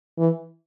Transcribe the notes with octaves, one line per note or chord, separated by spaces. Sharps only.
E3